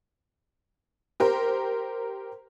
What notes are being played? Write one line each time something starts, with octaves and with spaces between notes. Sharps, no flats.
G4 A#4 C5